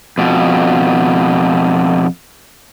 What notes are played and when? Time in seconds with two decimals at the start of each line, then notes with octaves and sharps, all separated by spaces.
0.18 F2 B2